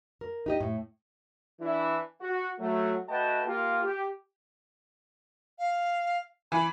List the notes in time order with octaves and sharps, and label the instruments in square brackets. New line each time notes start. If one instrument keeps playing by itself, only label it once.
[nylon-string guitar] A#4
D#4 G4 D#5
A2
[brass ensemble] E3 D4 E4
F#4
F#3 A3
A3 F#4 B4 D#5 G5 A5
A#3 F4 G4
G4
[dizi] F5
[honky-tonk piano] E3 [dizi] B5